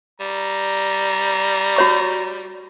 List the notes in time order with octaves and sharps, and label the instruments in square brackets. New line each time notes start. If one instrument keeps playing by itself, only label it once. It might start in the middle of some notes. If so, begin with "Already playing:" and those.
[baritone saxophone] G3 [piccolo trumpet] A#5
[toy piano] F#4 C#5 C#6